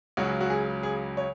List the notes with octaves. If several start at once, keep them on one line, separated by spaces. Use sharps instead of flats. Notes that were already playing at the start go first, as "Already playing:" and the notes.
C#2 C#3 F#3 F#4
F#4
G#4
G#4
C#5